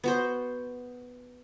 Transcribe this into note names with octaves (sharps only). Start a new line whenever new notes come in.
B3 F#4 C5